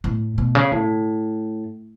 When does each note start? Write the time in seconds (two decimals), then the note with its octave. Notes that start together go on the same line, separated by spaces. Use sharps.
0.04 A2
0.38 B2
0.55 C#3
0.72 A2